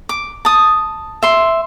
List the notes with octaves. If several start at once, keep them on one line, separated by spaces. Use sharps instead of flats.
D6
A5 D#6
E5 C6